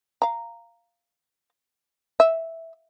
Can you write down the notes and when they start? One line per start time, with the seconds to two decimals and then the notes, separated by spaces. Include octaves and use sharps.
0.22 F5 A#5
2.20 E5